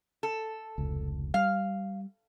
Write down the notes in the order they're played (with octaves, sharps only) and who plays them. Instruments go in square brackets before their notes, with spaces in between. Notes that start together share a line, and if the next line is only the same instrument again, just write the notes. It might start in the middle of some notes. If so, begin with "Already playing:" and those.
[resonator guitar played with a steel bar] A4
[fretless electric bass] F1 C#2
[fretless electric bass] G3 [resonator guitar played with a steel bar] F5